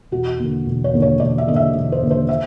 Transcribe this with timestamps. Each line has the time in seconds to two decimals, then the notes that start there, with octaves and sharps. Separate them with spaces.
0.11 E1 F#4
0.39 D#2 D3
0.66 E1
0.84 C#5
0.93 D#2 D3
1.02 C#5
1.20 E1 D5
1.38 E5
1.48 D#2 D3 D#5
1.56 E5
1.75 E1
1.92 C5
2.02 D#2 D3
2.11 C5
2.29 E5